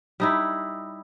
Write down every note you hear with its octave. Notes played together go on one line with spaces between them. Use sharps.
G3 D#4 E4